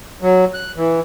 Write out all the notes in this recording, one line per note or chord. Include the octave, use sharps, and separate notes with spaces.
F#3
F#6
E3